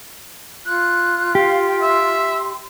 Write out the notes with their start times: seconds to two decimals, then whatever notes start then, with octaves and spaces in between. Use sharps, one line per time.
0.65 F4 F#6
1.35 G4 F5
1.67 G5
1.82 E5 C6